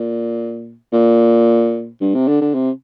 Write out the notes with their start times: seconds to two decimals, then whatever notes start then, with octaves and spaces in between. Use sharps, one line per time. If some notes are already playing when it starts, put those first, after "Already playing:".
Already playing: A#2
0.93 A#2
2.01 G2
2.14 C3
2.28 D3
2.41 D3
2.54 C3